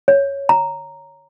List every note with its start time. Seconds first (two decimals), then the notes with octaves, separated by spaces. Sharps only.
0.08 C#5
0.49 A#5